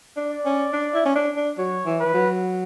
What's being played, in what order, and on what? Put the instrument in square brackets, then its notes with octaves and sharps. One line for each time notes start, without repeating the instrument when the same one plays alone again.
[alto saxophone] D4
[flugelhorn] D5
[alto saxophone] C#4
D4
E4
C#4
D4
D4
[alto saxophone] F#3 [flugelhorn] C#5
[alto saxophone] E3
[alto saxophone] E3 [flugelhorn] B4
[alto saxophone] F#3